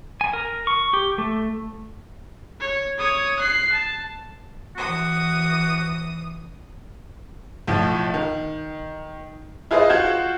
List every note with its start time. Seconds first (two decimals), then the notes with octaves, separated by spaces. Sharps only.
0.21 G#5
0.33 A#4
0.67 C#6
0.93 G4
1.18 A3
2.60 C#5
2.98 C#5 D#6
3.39 F#6 C7
3.72 A5
4.76 E3 F#4 D#6
7.67 B1 A2 F3
8.14 D#3
9.71 E4 F4 G#4 B4 C5 D#5
9.89 F4 F#4 G6 G#6 E7